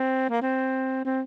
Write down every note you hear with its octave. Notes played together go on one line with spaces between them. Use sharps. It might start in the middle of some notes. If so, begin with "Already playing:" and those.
Already playing: C4
A#3
C4
C4